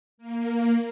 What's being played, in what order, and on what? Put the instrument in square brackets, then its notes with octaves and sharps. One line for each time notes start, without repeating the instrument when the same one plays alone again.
[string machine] A#3